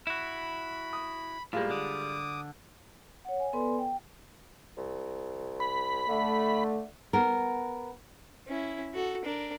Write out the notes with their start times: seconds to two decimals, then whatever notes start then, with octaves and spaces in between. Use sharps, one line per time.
0.07 E4 F#4 B5
0.93 D#6
1.53 A2 G3 G#3 A#3 F4
1.70 D3 D6 D#6
3.25 C#5 F#5
3.39 G#5
3.53 B3 A4 B4 D5 G#5 C6
3.79 G5
4.77 C2
5.60 B5
6.09 D3 A3
7.13 B3 A#4
8.48 C#4 E4
8.94 F#4 A4
9.25 D4 A#4